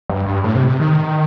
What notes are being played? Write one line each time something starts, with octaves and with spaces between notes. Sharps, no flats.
G2
G2
A2
C3
C3
D#3